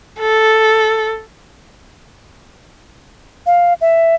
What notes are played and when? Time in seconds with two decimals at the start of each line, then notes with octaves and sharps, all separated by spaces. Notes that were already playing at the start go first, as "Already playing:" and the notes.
0.19 A4
3.46 F5
3.81 E5